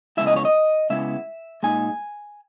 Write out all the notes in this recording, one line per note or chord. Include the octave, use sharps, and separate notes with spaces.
C#3 G#3 B3 E4 E5
D#5
C#5
D#5
C#3 G#3 B3 E4 E5
A#2 G#3 D#4 G#5